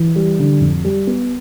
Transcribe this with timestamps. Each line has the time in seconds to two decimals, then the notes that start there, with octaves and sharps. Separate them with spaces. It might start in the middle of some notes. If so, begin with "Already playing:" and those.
Already playing: E3
0.16 G3
0.39 D3
0.61 F2
0.85 G3
1.07 B3